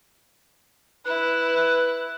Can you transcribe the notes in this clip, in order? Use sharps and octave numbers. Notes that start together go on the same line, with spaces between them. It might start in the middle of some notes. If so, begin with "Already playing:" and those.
E4 B4 F#6